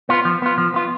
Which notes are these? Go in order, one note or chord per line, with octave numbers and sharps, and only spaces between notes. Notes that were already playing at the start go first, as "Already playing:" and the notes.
B3 F4
F3
B3 F4
F3
B3 F4